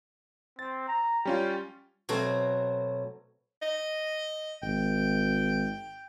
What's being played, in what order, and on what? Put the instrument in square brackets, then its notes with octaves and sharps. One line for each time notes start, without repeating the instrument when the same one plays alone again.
[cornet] C4 [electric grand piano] A6
[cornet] A#5
[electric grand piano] G3 C#4 F4 [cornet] G5
[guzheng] B2 F#3 A3 C4
[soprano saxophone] D#5
[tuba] G#1 [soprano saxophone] G5